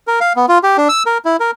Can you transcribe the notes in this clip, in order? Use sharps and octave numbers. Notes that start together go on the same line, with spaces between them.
A#4
F5
B3
F4
G4
D4
E6
A#4
E4
A#4